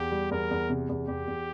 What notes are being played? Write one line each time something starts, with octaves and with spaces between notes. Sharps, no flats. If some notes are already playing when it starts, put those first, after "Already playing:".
Already playing: E2 G4
G3
E2 A#4
E2
C3
E2
E2 G4
E2